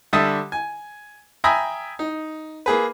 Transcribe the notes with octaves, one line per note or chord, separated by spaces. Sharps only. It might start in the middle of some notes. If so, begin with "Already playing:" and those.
D3 G3 E5 A5 D#6
G#5
E5 G5 G#5 A#5 B5 D#6
D#4
A#3 G#4 B4